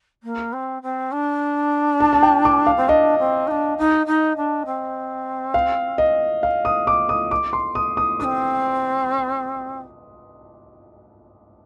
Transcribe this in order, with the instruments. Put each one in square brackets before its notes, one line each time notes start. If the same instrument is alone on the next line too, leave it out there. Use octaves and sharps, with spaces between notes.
[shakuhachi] A#3
C4
C4
D4
[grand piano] A5
A5
G5
D6
F5
[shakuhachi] C4
[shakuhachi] D4 [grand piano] D#5
[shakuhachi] C4
D#4
D4
D#4
D#4
D4
C4
[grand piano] F5
D#5
F5
D#6
D6
D#6
D6
C6
D#6
D#6
[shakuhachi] D4 [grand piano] D#6
[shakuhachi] C4